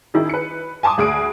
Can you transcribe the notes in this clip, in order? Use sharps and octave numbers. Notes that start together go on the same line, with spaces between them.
D#3 E4 G#4
B4 C#7
G#5 A5 C6 D6 D#6
D2 G#4 D#6 D7